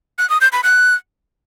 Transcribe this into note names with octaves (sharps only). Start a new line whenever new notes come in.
F#6
D#6
G6
B5
F#6